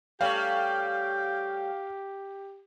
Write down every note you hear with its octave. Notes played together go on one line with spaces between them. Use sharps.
G3 A3 C#4 G4 F5 G5